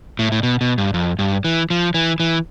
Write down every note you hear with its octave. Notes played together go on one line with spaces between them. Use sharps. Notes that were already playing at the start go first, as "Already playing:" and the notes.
A2
A2
B2
B2
G2
F2
G2
E3
F3
E3
E3